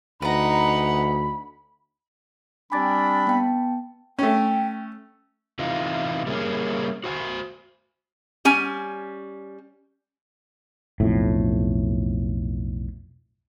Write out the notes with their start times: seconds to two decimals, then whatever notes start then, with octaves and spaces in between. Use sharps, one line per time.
0.22 D2 D#4 B4 F#5 A#5 B5
2.72 G3 C4 D4 G#5 B5 D6 A6
3.27 B3 G5 A5
4.19 A3 C#4 G5
5.59 C3 E3 D#4 F4
6.26 G3 A#3 C#4 G#4
7.04 F#4 C5 G5 G#5
8.45 G3 C#4 G#5
11.00 B1 F2 A2